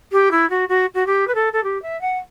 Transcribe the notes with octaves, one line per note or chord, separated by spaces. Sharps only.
G4
E4
F#4
F#4
F#4
G4
B4
A4
A4
G4
E5
F#5